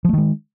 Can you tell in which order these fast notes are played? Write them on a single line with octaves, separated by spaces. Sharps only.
F3 A3 D#3 G#3